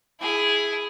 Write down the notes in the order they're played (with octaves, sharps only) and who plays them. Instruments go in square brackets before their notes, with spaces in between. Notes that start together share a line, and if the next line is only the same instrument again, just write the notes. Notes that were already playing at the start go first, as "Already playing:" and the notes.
[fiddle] E4 G#4